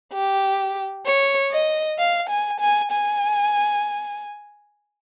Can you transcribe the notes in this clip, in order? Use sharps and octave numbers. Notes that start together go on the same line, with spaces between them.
G4
C#5
D#5
F5
G#5
G#5
G#5